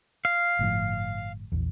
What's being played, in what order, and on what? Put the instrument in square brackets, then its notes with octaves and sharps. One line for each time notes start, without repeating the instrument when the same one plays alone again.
[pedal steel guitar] F5
[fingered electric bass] G1 A2 F3
A#1 E2